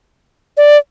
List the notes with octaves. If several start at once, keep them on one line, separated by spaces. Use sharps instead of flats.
D5